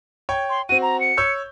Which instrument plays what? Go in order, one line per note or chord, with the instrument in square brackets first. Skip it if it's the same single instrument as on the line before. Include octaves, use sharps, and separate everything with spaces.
[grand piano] C#5 G5
[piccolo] C6
[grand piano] C4 F#4 [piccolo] D#7
[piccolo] A#5
C#7
[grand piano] C#5 E6 G6